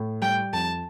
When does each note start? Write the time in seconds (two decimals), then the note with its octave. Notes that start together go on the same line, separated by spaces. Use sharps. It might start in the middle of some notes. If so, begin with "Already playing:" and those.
Already playing: A2
0.22 G3 G5
0.53 F2 A5